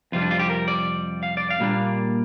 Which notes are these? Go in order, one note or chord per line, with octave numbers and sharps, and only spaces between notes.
F2 C3 G3 F4
D4
F4
G4
A#4
D5
F5
D5
F5
A#2 G3 A#3 D4